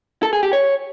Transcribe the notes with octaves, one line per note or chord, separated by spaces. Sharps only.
A4
G#4
G4
C#5